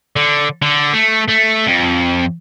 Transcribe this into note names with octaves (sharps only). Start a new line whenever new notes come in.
D3
D3
A3
A3
F2